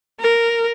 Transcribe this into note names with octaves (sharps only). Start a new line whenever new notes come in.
A#4